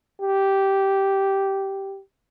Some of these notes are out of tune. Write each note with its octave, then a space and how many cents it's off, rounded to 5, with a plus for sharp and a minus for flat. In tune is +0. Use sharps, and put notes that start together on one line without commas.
G4 -10